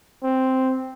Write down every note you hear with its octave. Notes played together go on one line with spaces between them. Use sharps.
C4